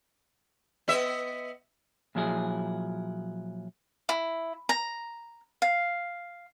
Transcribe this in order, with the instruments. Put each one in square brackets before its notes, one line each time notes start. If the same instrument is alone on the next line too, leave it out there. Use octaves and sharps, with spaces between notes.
[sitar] B3 D#5 E5
[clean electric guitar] A#2 F3 F#3 E4 G#4
[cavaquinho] E4
A#5
F5